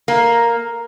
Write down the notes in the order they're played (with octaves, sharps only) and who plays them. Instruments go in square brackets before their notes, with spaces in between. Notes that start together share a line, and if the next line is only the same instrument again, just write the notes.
[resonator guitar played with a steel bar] A#3